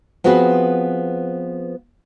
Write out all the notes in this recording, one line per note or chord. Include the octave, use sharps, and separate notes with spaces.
F3 B3 C4 F#4 G#4 B4